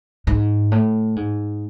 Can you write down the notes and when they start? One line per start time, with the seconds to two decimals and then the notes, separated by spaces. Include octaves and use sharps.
0.27 G#2
0.72 A2
1.16 G#2